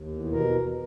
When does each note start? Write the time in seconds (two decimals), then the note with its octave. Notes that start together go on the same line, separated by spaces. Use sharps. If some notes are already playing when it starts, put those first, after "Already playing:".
Already playing: D#2
0.08 E2
0.26 B2
0.32 A#4